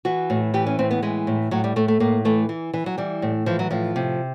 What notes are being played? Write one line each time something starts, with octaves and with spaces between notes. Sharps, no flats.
E3 F#4
A2
E3 G4
C#4
A2 C4
B3
E3 G#3
A2
A2 F#3
G3
A2 A3
A3
A2 A#3
E3 A3
E3
E3
F#3
E3 G3
A2
E3 F3
F#3
A2 F3
C3